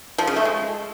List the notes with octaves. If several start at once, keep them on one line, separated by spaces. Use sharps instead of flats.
F3
C#3
A3
G#3